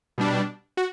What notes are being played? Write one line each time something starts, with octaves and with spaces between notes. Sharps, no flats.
B2 G3 D4
F#4